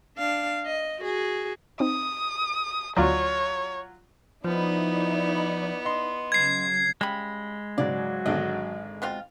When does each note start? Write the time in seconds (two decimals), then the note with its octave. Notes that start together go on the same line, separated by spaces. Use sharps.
0.17 D4 F5
0.66 D#5
1.00 F#4 G#4
1.80 C4 D#4 D#6
2.97 D2 F#3 F4 C#5 D5
4.45 F3 B3 D#4 E4 D5
5.85 D#5 C6
6.32 C#3 F#3 G#6 C7
7.01 C#3 G3 G#3 B5
7.78 G#2 C#3 F#3 D5
8.26 G#1 D3 D4 D#5
9.02 B2 C4 F4